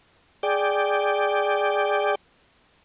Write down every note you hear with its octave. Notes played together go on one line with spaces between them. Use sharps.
G#4 D5 G5